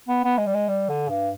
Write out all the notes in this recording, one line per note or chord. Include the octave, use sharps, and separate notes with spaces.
B3
B3
G#3
G3
G#3
G3
D3
G2